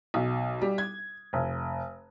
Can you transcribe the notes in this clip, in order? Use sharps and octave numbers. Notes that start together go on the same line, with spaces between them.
B1
G3
G#6
F1